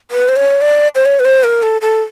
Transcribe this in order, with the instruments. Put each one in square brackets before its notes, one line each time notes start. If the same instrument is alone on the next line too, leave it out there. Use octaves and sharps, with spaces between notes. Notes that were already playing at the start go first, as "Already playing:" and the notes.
[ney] B4
C5
C#5
D5
C5
C#5
B4
C5
A#4
A4
A4